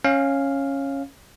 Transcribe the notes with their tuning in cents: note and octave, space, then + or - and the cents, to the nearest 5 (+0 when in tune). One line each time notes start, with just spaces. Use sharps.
C#4 -10 F5 +0